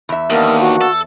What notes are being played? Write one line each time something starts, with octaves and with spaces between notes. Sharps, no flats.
E2 E5
D#2 A#3 B3 D4 A#4
F#4
A4